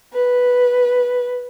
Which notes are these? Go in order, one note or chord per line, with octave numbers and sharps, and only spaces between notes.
B4